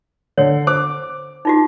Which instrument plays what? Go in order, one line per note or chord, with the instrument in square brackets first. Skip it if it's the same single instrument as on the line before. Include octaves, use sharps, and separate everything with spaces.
[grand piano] D3 [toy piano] C#5
[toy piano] C5 [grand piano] D6
[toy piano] D#4 F4 F#4